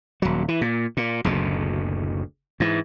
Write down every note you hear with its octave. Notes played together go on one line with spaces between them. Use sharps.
D#1 F#3
E3
A#2
A#2
F#1 D2 B2
G#2 E3